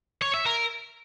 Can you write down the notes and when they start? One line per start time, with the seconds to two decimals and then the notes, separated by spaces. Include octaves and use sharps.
0.22 C#5
0.34 E5
0.46 A#4